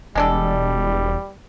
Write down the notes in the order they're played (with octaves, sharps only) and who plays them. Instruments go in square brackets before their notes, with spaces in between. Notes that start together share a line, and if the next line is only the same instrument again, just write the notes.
[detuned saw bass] E1 [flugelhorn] G3 [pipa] G#3 D4 A4